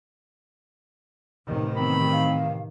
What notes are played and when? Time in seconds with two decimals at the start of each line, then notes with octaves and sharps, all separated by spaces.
1.46 A1 C3 D#3
1.77 B3 C4 B5
2.12 F5